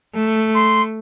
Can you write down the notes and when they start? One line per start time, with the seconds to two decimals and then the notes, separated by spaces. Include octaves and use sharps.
0.14 A3
0.55 C6